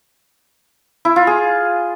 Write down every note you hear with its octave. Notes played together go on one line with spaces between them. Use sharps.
E4
F4
G#4